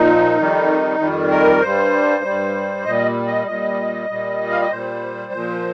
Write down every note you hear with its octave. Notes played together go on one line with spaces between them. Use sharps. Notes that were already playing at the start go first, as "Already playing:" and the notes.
Already playing: A#2 F3 D#4
F2 D#3 G3
F2 D#3 G3
A#4
G2 G3 C5
G2 G3
A#2 G3 D#5
D#5
A#2 G3 D#5
A#2 G3
F5
D#5
A#2 G3 C5
A#2 F3